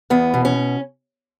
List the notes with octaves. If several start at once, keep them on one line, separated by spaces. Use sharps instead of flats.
E2 B3
B2
C#4